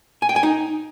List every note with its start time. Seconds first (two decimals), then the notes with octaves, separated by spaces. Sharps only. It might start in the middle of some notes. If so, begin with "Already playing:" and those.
0.22 G#5
0.29 G5
0.36 G#5
0.43 D#4